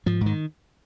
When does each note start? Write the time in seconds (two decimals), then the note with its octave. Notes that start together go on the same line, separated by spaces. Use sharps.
0.06 G#2 F3
0.21 G#2
0.26 D#3